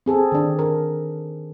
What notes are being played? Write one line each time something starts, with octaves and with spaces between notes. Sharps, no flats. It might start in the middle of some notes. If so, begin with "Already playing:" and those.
C4 G#4 A4
D#3 D4
A#4